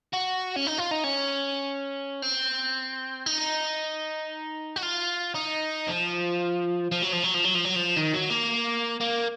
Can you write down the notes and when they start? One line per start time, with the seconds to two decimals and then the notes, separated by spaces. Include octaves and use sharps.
0.13 F#4
0.56 C#4
0.67 D#4
0.78 F4
0.91 D#4
1.04 C#4
2.22 C4
3.26 D#4
4.76 F#4
4.83 F4
5.35 D#4
5.88 F3
6.92 F3
7.02 F#3
7.12 F3
7.23 F#3
7.34 F3
7.44 F#3
7.55 F3
7.65 F#3
7.76 F3
7.97 D#3
8.14 F#3
8.30 A#3
9.01 A#3